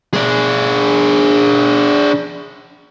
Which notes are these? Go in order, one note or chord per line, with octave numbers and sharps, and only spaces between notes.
D4 G#4